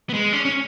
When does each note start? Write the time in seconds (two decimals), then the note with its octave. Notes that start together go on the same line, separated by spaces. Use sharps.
0.09 B3
0.13 G#3
0.33 C#4
0.45 C#4